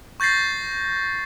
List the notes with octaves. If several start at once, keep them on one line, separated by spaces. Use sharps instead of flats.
C#6 G6 A6 A#6 C7